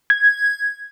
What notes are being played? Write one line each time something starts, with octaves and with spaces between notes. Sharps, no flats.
G#6